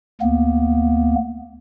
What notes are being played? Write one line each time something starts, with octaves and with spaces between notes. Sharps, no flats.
D2 A#3 B3